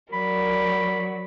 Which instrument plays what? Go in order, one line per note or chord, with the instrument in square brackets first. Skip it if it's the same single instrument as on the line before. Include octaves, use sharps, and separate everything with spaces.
[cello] F#3 [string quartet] A#4 D5 [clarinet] B5